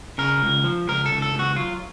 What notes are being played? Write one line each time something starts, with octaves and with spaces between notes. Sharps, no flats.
C#3 A#4
C#2
F3
C#2 A#4
A4
C#2
A4
C#2
F#4
F#3 F4